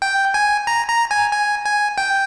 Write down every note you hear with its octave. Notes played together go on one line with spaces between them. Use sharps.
G5
G#5
A#5
A#5
G#5
G#5
G#5
G5